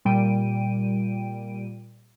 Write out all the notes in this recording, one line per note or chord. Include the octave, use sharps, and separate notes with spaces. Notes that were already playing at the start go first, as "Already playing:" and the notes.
A#2 G3 G5 D7 D#7